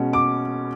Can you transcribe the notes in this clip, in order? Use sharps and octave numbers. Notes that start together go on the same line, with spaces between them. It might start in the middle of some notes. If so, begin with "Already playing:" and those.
Already playing: B2 G#3 C#4
D6